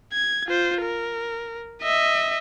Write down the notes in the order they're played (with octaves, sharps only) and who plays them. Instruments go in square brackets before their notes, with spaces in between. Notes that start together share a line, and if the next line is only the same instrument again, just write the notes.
[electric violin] G#6
F4 C5
A#4
D#5 E5